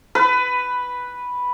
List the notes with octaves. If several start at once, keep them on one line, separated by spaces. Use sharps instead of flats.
B4